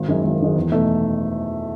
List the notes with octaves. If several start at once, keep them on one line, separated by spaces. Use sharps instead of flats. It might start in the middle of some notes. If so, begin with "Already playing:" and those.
Already playing: G#1
F#2 D#3 G#3
G#1
F#2 D#3 G#3
E2
B2 A3 D#4